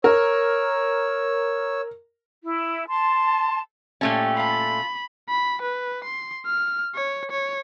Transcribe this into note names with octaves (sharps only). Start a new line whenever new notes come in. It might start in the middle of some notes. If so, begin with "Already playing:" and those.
A#4 C#5 E6
E4
A5 C6
A#2 A3 C#4 G4 A5
F4 A5 B5
B5
B4
C6
F6
C#5
C#5